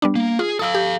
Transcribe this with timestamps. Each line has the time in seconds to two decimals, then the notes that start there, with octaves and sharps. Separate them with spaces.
0.02 G3 B3 D4
0.15 A#3
0.39 F4 G#4
0.59 A4 F5 D#6 E6
0.75 G4